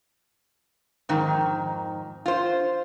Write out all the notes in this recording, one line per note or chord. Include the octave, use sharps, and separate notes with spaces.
F2 G#2 D#3
F4 C5